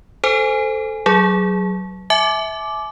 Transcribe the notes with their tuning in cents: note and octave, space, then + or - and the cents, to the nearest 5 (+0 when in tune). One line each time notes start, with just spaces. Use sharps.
A4 +0 C5 -15 G#5 +0
F#3 +15 G#4 +0
E5 -15 G#5 +45 D6 +0